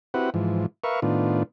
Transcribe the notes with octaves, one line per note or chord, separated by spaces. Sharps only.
C4 E4 F#4 G4 B4 F#5
G#2 E3 F3
A#4 B4 E5 F5 C#6
A2 D#3 B3 D4 F4